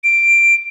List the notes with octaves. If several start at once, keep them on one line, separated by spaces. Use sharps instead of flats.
D7